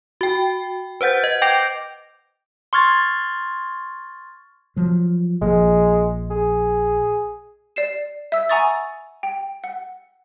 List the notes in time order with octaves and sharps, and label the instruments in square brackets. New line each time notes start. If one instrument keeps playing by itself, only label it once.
[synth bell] F#4 G5
B4 C5 F#5 G6 A6
D#5
G5 D6 G6 A#6 D7 F7
[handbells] C6 C#6 F6 G#6 A6
[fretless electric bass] F3 F#3
[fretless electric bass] A#1 F3 A#3 [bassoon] G#3
[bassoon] G#4
[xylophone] D5 C7 E7
E5 E6
F#5 G#5 A#5 C#6 D#6 A6
G5
F#5